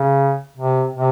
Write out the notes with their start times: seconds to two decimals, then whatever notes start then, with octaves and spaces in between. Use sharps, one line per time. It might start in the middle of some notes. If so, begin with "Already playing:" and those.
Already playing: C#3
0.57 C3
0.96 C3